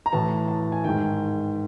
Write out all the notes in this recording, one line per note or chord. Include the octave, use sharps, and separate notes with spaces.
A#5
A2 E3 A5
A5
G#5
G#2 D#3 G5